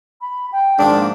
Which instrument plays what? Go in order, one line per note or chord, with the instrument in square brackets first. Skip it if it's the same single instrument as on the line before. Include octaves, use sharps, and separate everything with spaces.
[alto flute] B5
G5
[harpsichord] G#2 D#3 F3 [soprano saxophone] D4
[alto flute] A#3